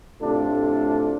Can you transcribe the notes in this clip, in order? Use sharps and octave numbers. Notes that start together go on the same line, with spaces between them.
A2 C3 A3 D4 F4 A4